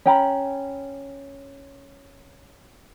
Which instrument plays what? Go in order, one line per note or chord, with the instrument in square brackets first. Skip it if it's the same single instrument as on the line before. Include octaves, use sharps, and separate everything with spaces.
[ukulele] C#4 G5 A#5 B5